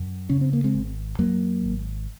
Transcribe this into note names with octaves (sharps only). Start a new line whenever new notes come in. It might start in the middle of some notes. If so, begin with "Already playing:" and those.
Already playing: F#2
C#3 C#4
C4
A#3
G#3 C4
G#1
F#2 F#3 A#3
G#1